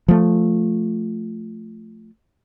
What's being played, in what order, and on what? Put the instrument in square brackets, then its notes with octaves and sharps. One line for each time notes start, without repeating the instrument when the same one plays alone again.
[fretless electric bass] F3 A3